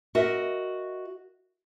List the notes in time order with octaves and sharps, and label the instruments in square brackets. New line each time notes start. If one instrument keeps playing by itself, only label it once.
[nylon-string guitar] F#4 A#4 D#5 E5